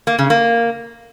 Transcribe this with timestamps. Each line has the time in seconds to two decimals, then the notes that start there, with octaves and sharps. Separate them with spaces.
0.07 A#3
0.19 C#3
0.30 A#3